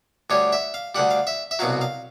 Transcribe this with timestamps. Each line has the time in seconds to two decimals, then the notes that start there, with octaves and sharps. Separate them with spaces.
0.30 D2 D3 G3 C#5
0.53 E5
0.74 F5
0.95 D2 D3 G3 F#5
1.11 F5
1.27 E5
1.51 E5
1.59 C2 B2 F#3 F5
1.81 F5